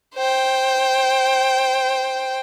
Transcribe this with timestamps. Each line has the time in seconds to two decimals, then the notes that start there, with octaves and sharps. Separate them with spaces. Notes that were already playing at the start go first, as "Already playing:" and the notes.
0.15 C5 G5